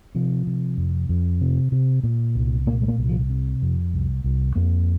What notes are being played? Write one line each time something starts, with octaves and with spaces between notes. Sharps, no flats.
C3 F3
C3
F2
F2
C3
C3
A#2
C2
A#2 A#3
G#3
A#3
C2
F3
C3
F2
C2
C2
F2 A#3